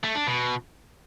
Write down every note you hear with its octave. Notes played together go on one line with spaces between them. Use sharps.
A3
D4
B2